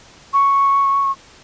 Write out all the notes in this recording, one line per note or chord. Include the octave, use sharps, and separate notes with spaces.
C#6